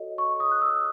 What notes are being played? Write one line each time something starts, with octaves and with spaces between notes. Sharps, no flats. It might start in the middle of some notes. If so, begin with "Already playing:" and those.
Already playing: F#4 A4 C#5 D#5
C#6
D#6
F#6
E6